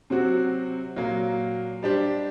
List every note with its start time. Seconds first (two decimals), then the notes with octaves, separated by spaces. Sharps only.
0.10 C3 F#3 C4 F#4
0.96 A#2 F#3 A#3
1.83 G3 D4 G4 C5